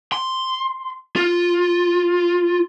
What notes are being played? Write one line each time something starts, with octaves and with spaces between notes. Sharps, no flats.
C6
F4